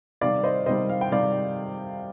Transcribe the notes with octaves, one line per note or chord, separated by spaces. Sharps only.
C3 D#3 G3 D5 F5
C5 D#5
C3 D#3 G3 C5 D#5
F5
G5
C3 D#3 G3 D5 F5